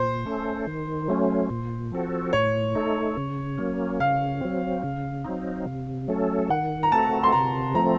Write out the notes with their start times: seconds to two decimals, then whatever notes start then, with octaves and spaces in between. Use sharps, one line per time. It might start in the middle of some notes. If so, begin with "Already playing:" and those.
Already playing: A#2 C5
0.25 A3 C#4 A4
0.67 D#3
1.08 F#3 A3 C#4
1.50 A#2
1.92 F3 C4 F#4 A4
2.33 A2 C#5
2.75 A3 D#4 A4
3.17 C#3
3.58 F#3 A#3 C#4
4.00 C#3 F5
4.41 F#3 C4
4.84 C#3
5.25 F#3 C4 D#4
5.66 C3
6.08 F#3 A3 C#4 A4
6.50 D#3 F#5
6.83 A#5
6.92 A3 C4 F#4 A4 A5
7.23 C6
7.32 C3 A#5
7.74 F3 A3 C4 A#5